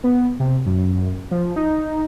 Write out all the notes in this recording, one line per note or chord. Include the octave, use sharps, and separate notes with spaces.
B3
C3
F#2
F3
D#4